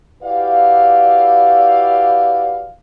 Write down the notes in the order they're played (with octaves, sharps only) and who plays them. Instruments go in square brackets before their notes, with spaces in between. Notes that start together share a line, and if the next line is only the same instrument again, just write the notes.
[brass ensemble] E4 F#4 G4 B4 D5 F5